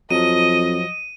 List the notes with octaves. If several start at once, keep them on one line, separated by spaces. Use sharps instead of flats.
F2 F3 F#3 D#5 D#7